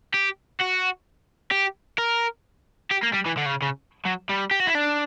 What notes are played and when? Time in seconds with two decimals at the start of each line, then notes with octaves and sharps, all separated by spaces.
0.14 G4
0.60 F#4
1.52 G4
1.98 A#4
2.91 G4
3.03 A#3
3.13 G3
3.26 E3
3.37 D3
3.46 C#3
3.62 C#3
4.06 F#3
4.30 G3
4.51 G4
4.60 F#4
4.67 E4
4.75 D4